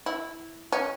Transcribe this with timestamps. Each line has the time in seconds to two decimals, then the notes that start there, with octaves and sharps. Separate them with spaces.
0.06 E4
0.72 C#4